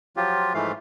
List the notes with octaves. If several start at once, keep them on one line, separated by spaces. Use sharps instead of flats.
F3 F#3 F4 G4
G#2 E3 F3 A3 F5